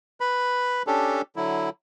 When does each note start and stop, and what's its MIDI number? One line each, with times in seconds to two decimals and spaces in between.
0.20 0.83 71
0.20 0.83 83
0.87 1.22 61
0.87 1.22 62
0.87 1.22 67
0.87 1.22 69
1.36 1.70 50
1.36 1.70 54
1.36 1.70 64